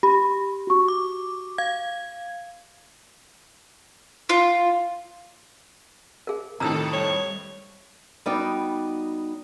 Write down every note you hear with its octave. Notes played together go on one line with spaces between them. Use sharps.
G4 B5
F#4 C#6
D6
F5 G#6
F4
G#4 A#4
F2 A2 C3 D#3 A4 A#5 D#6 E6
G3 C#5
G3 B3 D#4 F#4 D5 G5